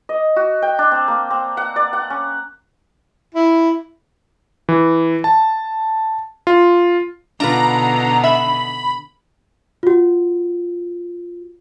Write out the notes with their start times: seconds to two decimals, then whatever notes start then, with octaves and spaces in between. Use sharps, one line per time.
0.09 D#5
0.36 F#4
0.62 G5
0.79 D4
0.91 C4
1.08 A#3
1.30 C4
1.57 F#5
1.76 D5
1.93 F#5
2.10 C#4
3.35 E4
4.69 E3
5.24 A5
6.47 F4
7.40 B2 D3 D4 D#4 F4 B4 A#5
8.24 E5 B5
9.83 F4 F#4